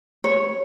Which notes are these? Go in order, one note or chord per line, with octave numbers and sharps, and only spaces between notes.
C#5